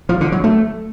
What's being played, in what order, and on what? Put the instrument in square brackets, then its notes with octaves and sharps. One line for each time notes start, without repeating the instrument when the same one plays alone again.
[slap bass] F3
D3
F#3
A3